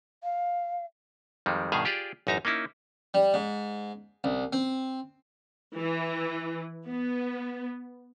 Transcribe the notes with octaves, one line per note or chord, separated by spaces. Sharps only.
F5
F2 D#3 G3 G#3
G2 B2 D#3 G#4 E5 F5
F4 G4 G#4 D5
A1 F#2 D#4 E5 A#5
A#3 C#4 D#4 E4
G3
G#2
C2
C4
E3
B3